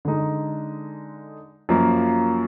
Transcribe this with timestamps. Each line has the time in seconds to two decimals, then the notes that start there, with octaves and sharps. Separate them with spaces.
0.05 D3 G#3 D#4
1.69 F#2 F3 A#3